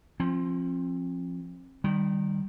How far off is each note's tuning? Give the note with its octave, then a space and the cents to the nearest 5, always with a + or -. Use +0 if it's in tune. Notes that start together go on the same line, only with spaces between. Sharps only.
F3 +0 C4 +35
D#3 -20 G3 +0